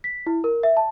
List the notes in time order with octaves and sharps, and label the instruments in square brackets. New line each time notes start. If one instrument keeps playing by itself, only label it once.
[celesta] B6
E4
A#4
E5
A5